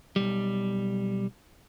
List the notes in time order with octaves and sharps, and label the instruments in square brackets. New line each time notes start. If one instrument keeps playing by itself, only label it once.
[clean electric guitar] B1 G3